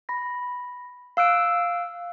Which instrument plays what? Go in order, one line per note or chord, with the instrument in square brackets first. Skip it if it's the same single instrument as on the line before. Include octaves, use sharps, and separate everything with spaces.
[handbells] B5 A#6
F5 E6 F#6 D7